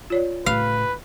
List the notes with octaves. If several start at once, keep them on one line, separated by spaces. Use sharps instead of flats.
F4 C#5 D5
A2 C#3 B4 F5